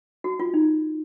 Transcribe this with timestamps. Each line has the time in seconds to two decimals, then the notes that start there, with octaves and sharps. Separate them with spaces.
0.24 F#4
0.40 F4
0.54 D#4